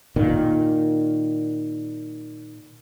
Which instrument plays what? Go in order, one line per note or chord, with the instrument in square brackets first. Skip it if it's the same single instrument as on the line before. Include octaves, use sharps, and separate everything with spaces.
[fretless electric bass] A#2 D#3